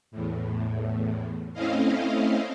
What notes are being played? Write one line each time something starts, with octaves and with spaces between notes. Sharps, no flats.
E2 A2
A3 C4 C#4 E4 D#5 F5